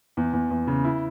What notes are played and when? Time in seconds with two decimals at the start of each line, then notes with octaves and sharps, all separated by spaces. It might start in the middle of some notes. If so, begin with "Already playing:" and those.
0.17 E2
0.33 E2
0.50 E2
0.67 C#3
0.85 E4